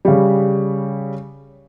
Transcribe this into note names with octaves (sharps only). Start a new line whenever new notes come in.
C#3 G3